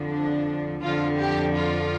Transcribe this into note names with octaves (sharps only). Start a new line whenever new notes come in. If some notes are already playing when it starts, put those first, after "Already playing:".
Already playing: F2 D3 F3
D4
F2 D3 F3 F4
G4
F4